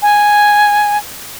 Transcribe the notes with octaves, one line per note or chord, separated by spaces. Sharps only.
G#5